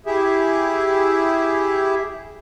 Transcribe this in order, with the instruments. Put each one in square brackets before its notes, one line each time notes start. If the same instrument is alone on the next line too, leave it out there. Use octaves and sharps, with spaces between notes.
[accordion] E4 G4 G#4 E5